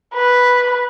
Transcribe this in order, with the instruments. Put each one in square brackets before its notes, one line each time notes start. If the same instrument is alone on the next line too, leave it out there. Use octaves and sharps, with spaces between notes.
[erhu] B4